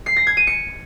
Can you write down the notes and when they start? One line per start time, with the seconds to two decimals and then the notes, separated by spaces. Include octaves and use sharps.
0.06 C7
0.16 A#6
0.27 G#6
0.37 D#7
0.47 C#7